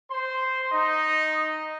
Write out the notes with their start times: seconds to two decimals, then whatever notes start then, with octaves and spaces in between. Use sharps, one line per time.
0.11 C5 C6
0.72 D#4 D#5